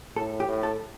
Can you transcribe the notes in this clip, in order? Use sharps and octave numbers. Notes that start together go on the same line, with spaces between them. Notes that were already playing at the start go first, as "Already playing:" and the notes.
A2 A4
G4
A2
A4